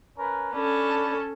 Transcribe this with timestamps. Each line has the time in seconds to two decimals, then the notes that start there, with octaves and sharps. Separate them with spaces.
0.17 C#4 A#4 B4
0.53 C#4 D4 A4 B5